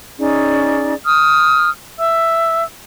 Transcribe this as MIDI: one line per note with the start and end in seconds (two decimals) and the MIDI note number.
0.19 0.94 61
0.19 0.94 63
0.19 0.94 68
0.19 0.94 74
1.05 1.70 87
1.05 1.70 89
1.98 2.63 76
1.98 2.63 88